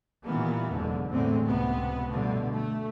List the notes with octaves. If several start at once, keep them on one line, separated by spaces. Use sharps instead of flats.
A#2 D#3 E3 G3 A#3 B3
F#1 E2 G#2 B2 D3
E2 A2 D3 G#3 A3 C4
C#2 C3 B3
G2 B2 D3 A3
A3